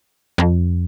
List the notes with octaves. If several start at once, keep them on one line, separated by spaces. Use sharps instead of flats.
F2